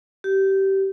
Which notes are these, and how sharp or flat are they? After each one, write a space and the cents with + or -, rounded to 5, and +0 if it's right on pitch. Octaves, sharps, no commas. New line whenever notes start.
G4 -20